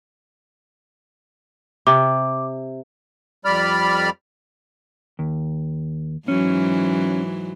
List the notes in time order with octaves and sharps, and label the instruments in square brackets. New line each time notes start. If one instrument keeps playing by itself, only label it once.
[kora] C3 [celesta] D6
[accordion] F2 G3 D5 B5 F6
[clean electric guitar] D#2
[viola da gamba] G#2 E3 F#3 [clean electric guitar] C#4